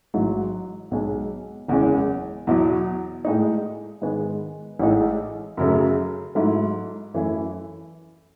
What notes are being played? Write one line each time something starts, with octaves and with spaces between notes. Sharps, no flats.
A1 G#2 F#3
B1 B2 G#3
F#1 E2 C#3 G#3 C#4
E2 B2 F#3
A2 G#3 D#4
G#2 D#3 G#3 B3
A1 A2 G#3 D#4
F#2 C#3 F#3 A3
G#2 F#3 A3 E4
F#2 E3 A3 C#4 E4